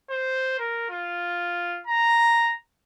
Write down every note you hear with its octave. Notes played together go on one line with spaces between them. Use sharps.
C5
A#4
F4
A#5